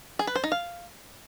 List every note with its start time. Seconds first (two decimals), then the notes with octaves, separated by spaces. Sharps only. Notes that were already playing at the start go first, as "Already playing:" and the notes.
0.19 G#4
0.27 B4
0.35 C5
0.44 D#4
0.52 F5